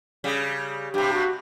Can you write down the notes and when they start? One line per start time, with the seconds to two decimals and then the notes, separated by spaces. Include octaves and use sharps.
0.24 C#3 G3
0.94 G2 C3 G4
1.13 F#4